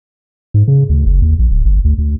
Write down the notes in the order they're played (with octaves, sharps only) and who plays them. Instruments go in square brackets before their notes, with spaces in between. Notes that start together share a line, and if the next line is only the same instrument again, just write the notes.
[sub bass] G#2
C#3
D2
F#1
D#2
A#1
D1
G1
D2
D2